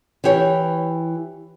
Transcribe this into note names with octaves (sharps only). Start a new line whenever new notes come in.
E3 E4 G4 C#5